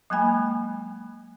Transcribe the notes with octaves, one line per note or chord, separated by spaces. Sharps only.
F#3 G#3 A#3 G#5 B5